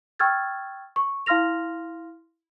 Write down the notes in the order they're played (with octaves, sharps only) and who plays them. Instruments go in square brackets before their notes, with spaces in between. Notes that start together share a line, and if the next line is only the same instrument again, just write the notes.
[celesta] G5 C#6 E6 F6 G#6 A6
C#6
E4 F5 C6 F6 A#6 F7